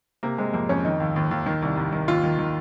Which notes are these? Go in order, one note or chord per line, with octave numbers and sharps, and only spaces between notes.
C3 A#3
C3 G#3
F2 A#3
F2 C#4
D#3 D#4
D#2
D#2
D#2
D#3
C2
C2
D#3
D#2 F4
D#3
D#3